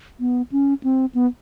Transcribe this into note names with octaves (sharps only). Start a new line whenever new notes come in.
B3
C#4
C4
B3